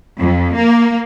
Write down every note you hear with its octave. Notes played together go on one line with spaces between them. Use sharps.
F2
A#3